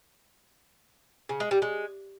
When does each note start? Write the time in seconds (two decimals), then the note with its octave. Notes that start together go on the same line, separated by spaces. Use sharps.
1.29 C#3
1.40 G#3
1.51 G3
1.62 G#3